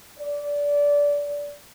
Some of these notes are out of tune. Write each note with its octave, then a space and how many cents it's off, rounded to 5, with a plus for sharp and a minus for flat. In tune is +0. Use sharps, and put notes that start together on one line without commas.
D5 -20